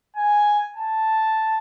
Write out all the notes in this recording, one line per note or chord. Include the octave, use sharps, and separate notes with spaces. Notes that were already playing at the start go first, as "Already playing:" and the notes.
G#5
A5